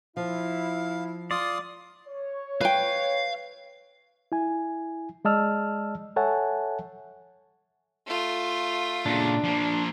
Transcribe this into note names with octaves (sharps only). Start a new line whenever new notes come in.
F3 E4 F5
F4 D5 C6 D#6
C#5
B4 F5 G5
E4 G#5
G#3 D5 D#5 A5 E6 F6
A4 C#5 E5 F#5 G#5 A5
A3 F4
A#2 C#3 D4
F3 A#3